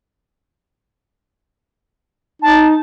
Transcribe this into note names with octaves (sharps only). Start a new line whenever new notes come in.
D#4 A5